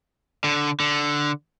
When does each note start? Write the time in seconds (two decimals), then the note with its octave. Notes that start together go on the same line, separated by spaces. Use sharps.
0.44 D3
0.80 D3